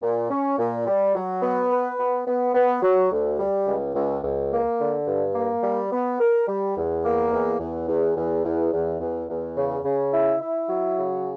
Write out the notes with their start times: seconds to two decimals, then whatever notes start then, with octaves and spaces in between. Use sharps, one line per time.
0.02 A#2
0.30 C#4
0.59 A#2
0.87 G3
1.15 F#3
1.43 B3
1.71 B4
1.99 B3
2.27 B3
2.55 B3
2.83 F#3
3.12 D2
3.39 G3
3.67 C#2
3.95 C#2
4.24 C#2
4.52 A#3
4.80 D3
5.08 G2
5.35 A#3
5.63 G3
5.93 B3
6.20 A#4
6.48 G3
6.76 E2
7.05 A#3
7.33 E2
7.60 E2
7.88 E2
8.17 E2
8.45 E2
8.73 E2
9.01 E2
9.29 E2
9.57 C#3
9.85 C#3
10.13 E4
10.41 E4
10.69 F#3
10.98 C#3